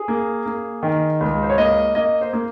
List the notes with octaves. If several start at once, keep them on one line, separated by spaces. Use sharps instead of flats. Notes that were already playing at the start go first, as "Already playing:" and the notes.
Already playing: G#4
A#3
A#3
D#3
C#2
C5
C#5
A#3 D#5
A#3 D#5
C5
A#3